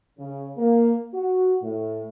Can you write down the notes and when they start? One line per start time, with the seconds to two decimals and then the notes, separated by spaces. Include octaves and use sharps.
0.18 C#3
0.57 A#3
1.13 F#4
1.61 A2